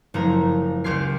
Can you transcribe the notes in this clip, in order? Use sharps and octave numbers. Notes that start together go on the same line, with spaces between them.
F#1 F3 A3 A#4 A#5
C#2 G4 C6 F6 G#6 C7